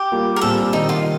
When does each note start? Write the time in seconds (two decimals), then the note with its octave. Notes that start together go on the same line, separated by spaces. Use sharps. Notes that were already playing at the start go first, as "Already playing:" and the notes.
Already playing: G4
0.12 G3 A#3 F4
0.36 A#4
0.41 A#2 G3 C4 A4
0.73 C3 D#3 A#3 D#4
0.89 F4